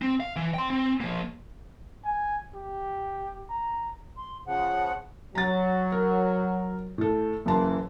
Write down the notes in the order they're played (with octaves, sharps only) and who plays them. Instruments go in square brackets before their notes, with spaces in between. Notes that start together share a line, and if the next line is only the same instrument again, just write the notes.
[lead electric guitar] C4
F5
E3
G5 C6
C4
F3 A#3
[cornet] G#5
G4
A#5
[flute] C6
[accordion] C#3 F3 [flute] F#5
[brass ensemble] F#3 [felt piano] A#5 A6
[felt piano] A#4
A2 A4
[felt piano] F#2 A5 C6 [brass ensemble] C#3 E3 A#3